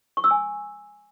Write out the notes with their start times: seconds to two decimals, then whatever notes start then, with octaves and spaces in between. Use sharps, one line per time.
0.17 C#6
0.24 E6
0.31 G#5